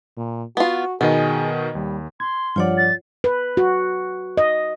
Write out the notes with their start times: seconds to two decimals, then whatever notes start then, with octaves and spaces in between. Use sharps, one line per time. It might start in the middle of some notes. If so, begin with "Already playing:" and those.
0.17 A#2
0.57 B3 F4 F#4
1.01 B2 D#3 B3 G#4 D#5
1.75 D#2 G3
2.20 C6 G#6
2.56 G2 F3 F4 C#5 D5 F#5
2.77 A6
3.24 B4
3.57 F#4
4.37 D#5